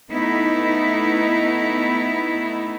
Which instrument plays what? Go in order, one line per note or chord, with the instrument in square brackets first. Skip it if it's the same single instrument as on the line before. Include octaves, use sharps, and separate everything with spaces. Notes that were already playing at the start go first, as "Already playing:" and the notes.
[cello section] A3 B3 D#4 E4